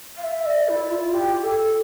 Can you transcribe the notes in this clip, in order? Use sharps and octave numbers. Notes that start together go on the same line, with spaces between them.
F5
E5
D5
E4
F4
G4
A4